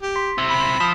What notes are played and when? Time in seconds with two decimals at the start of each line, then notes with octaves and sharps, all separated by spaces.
0.03 G4
0.16 C6 B6
0.38 C4 E4 E6
0.50 B5
0.80 F3 D#6 B6 E7